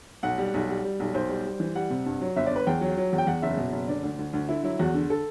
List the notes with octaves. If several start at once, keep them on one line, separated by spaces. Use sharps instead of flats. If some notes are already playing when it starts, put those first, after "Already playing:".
B1 F#5
G3
B1
G3
G3
B1
B1 C5
G3
G3
E3
G3 F#5
C3
G2
F#3
G1 E5
D5
G1 B4
E2 G5
F#3
F#3
E2
G5
E2 F#5
F#1 E5
B2
F#1
D3 D5
D2
D2
D2
D3 E4
F#3 E4
E2 F#4
D3
A4